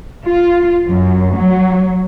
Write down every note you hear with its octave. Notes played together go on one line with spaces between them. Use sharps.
F4
F#2
F#3